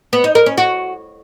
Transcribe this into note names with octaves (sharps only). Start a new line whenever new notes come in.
B3
D#4
A#4
C#4
F#4